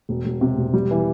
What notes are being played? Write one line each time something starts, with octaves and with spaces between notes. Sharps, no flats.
E1
E1
C3
E1
G3
E3